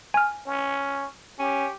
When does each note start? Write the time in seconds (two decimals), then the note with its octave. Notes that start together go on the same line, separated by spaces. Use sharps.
0.14 G#5 F6
0.46 C#4
1.39 C#4 G4